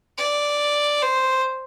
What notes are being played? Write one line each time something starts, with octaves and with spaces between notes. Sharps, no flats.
D5
C5